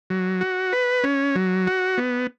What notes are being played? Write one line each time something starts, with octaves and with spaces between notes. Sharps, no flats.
F#3
F#4
B4
C#4
F#3
F#4
B3